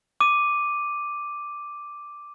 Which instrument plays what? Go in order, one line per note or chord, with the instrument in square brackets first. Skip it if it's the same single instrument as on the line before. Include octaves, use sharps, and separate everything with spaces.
[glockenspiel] D6 D#7